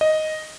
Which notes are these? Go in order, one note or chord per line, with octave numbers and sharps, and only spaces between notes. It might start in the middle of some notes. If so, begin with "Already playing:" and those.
D#5